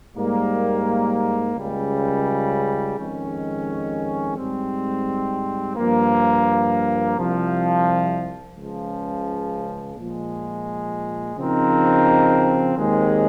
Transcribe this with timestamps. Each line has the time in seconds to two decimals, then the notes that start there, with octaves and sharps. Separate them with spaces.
0.16 G#2 G3 A#3
1.56 C#2 C#3 G3
2.97 F2 D#3 G#3 C#4
4.37 G#2 G3 C4
5.76 G2 F3 A#3
7.17 C2 C3 F3
8.57 C#2 C#3 F3
9.96 A#2 F3 G#3
11.36 C#3 F3 C4 D#4 A#4
12.76 D#2 D#3 G#3 C4